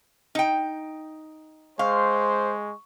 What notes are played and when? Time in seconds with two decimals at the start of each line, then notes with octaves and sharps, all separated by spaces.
0.35 D#4 G5
1.79 G#3 C5 F5 C#6